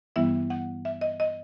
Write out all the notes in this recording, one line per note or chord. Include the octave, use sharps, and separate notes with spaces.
G2 E3 G3 B3 E4 E5
F#5
E5
D#5
D#5